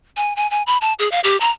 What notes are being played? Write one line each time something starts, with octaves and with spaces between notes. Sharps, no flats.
G#5
G#5
G#5
B5
A5
G#4
F5
G4
A#5